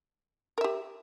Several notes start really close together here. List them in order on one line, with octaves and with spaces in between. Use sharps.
A#4 E5 G4